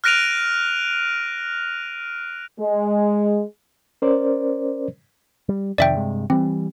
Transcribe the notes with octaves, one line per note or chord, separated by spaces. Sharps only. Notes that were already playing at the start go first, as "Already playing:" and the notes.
F6 F#6 A#6 D7 D#7 F7
G#3
C#4 A#4 C5 D5
G3
F2 C3 D#3 D5 E5 G5
G2 C3 G#3
E3 G3 C4